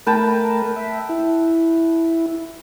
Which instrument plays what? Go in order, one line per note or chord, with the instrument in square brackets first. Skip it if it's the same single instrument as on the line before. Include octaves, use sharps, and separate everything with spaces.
[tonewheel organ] A3 A#4 [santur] B4 G5 A5
[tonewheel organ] E5
E4